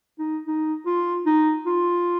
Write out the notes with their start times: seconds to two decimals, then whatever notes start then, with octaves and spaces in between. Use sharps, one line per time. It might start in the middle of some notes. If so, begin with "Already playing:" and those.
0.19 D#4
0.46 D#4
0.86 F4
1.26 D#4
1.66 F4